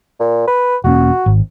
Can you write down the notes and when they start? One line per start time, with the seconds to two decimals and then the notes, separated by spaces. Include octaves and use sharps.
0.20 A#2
0.47 B4
0.84 E1 A#3 C#4 F#4
1.26 G#1